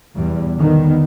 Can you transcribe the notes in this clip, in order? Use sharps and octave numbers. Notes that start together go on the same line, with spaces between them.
E2 E3 G3
D3 D#3 B3